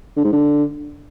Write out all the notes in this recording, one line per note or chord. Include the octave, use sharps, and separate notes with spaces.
D3
G#2
D3